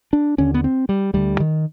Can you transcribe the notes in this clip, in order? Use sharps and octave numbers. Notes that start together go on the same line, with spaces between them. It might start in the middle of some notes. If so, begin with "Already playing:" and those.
D4
D#2 D3 C#4
B3
C4
G3
D2 D3 G3
D#3